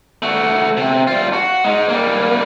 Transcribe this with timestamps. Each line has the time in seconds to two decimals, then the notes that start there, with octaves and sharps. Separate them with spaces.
0.23 A3 F#4
0.77 C3
1.07 G3 F4
1.33 F#4
1.64 G#3 D#4
1.89 G3 A#3